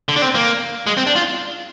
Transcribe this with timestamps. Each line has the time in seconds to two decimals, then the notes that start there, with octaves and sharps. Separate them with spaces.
0.09 D3
0.16 D4
0.22 C4
0.35 A#3
0.87 G#3
0.97 C4
1.07 D4
1.16 F4